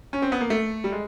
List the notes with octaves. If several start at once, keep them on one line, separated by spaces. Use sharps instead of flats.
C#4
C4
B3
A#3
A3
G3
G#3